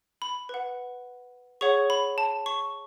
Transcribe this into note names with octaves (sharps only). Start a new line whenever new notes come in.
B5
B4 F#5
G#4 C#5 F#5 C#6
B5
A5
C#6